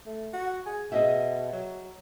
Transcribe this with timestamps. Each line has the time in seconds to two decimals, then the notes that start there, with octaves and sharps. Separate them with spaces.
0.06 A3
0.34 F#4
0.66 G#4
0.92 B2 G#4 D#5 E5
1.53 F#3